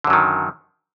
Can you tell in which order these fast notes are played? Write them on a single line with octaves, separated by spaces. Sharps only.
D3 F#2 F#3 D#3